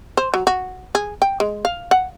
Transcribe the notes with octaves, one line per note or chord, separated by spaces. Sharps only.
C5
F#3
F#4
G#4
G5
G#3
F5
F#5